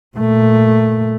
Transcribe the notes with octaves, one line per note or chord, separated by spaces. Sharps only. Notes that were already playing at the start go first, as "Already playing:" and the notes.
A#2 A3